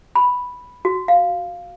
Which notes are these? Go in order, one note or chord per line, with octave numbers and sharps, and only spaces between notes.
B5
F#4
F5